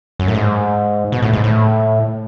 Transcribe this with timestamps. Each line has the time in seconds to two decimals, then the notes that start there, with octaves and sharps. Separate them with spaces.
0.19 F#2
0.28 A2
0.35 G#2
1.12 B2
1.22 A2
1.33 G#2
1.44 A2